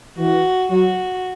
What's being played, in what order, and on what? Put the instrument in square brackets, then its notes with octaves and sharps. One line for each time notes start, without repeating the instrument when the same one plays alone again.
[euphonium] E3 [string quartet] F#4
[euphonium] F#3 [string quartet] F#4